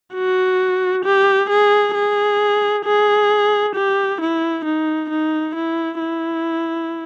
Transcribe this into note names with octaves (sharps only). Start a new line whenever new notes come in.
F#4
G4
G#4
G#4
G#4
G4
E4
D#4
D#4
E4
E4